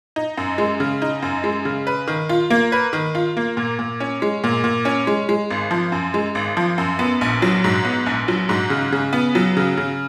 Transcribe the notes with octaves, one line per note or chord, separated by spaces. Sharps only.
D#4
F#2
G#3
C#3
D#4
F#2
G#3
C#3
B4
D#3
F4
A#3
B4
D#3
F4
A#3
A#2
A#2
C#4
G#3
A#2
A#2
C#4
G#3
G#3
G#1
F3
F#2
G#3
G#1
F3
F#2
B3
A#1
F#3
G#2
B3
A#1
F#3
G#2
C#3
C#3
B3
F#3
C#3
C#3